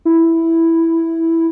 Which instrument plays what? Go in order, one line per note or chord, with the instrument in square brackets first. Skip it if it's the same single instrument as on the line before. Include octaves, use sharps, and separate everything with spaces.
[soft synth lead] E4